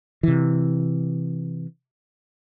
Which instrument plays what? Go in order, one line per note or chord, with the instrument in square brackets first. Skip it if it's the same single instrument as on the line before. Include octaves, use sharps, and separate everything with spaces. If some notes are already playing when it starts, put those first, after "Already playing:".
[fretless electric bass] C3 E3